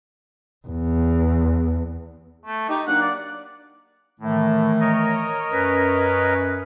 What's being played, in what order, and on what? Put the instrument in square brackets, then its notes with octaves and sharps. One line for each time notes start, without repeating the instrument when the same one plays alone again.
[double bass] E2
[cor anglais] A3
[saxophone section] D#4 [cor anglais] G4
[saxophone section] F#3 A#3 D4 [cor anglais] F#5
[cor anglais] D5
[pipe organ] A2 [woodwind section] D#3 E3 A3
[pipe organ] A#4 C#5 D#5
[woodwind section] F#2 C#4 B4